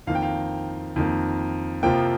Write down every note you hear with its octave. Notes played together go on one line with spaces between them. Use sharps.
F2 D#3 A#3 F5
G5
F5
F2 D#3 A#3
F2 C3 F3 A#3 G5